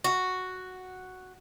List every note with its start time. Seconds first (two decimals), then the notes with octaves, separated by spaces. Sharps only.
0.04 F#4